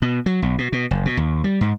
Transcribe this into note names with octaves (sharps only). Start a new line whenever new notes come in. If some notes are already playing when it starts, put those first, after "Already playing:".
B2
F#3
B1
B2
B2
F#1
B2
D#2
G3
G#2